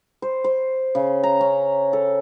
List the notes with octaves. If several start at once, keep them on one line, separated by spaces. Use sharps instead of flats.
C5
C5
C#3
A#5
C#4
A4